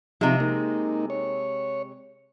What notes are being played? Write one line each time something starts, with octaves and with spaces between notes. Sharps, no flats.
C3 F3 G#3 D#4 E5
A#3 D#4
C#5